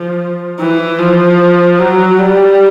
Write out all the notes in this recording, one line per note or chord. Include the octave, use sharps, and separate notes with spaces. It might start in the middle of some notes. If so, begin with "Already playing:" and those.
Already playing: F3
E3
F3
F#3
G3